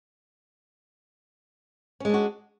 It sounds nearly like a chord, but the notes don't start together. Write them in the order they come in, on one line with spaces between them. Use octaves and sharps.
C#4 G#3 D4 F#4